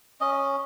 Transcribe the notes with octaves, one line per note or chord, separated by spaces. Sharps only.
C#4 D#5